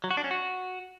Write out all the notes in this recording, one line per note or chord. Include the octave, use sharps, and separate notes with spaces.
F#3
F#4
D4
C#4
F#4